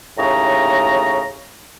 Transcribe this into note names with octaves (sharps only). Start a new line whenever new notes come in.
D#2 A2 C#3 A#5